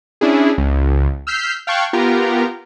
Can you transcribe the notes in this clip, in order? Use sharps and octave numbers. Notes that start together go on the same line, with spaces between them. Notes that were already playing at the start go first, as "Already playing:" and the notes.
C#4 D4 E4 G#4
C#2
E6 F6 G6 B6 C7
F5 G5 A5 C#6 F#6 G#6
B3 F4 G4 A#4 A#5